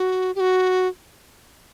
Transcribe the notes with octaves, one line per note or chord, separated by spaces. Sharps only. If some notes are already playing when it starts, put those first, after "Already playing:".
Already playing: F#4
G4
F#4